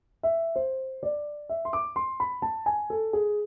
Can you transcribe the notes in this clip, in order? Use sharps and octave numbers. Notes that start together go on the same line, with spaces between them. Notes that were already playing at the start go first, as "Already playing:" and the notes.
E5
C5
D5
E5
C6
D6
C6
B5
A5
G#5
A4
G#4